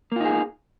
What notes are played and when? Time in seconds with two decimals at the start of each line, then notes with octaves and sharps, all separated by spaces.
0.12 A#3
0.16 F4
0.20 D#4
0.25 G#4